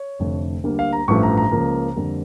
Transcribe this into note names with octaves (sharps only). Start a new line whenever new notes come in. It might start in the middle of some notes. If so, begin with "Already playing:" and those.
Already playing: C#5
F1 F2 D3 A3
D2 D3 G3 A#3
F5
A#5
A1 G2 F3 A3 C#6
A#5
A#5
C#2 C#3 F3 A#3
F2 D3 G3 A#3